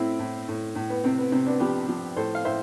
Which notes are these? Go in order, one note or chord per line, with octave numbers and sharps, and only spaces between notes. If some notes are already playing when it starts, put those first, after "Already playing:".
Already playing: A2 C4 E4
A2
A2
A2
B3
C3 C4
B3
C3 C4
B3 D4
F3 G4 B4
F3
A2 A4 C5
F5
A2 C5 E5